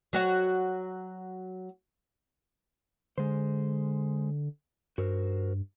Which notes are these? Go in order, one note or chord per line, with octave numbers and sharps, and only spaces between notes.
F#3 F#4 C#5
D3 G#3 C5
G2 F#4 A#4 C5